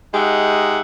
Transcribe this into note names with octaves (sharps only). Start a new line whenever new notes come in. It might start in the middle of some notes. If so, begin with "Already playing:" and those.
G#3 D#4 G4 E5 F#5